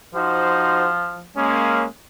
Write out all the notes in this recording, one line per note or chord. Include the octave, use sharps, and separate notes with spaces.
F3 D#4 F#4 C5
G#3 A#3 C#4